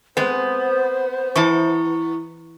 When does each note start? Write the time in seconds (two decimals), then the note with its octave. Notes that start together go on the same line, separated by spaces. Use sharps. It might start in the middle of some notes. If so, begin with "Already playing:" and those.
0.17 G#3 B3 C4 C5
1.36 E3 E4 D#5 A5 C#6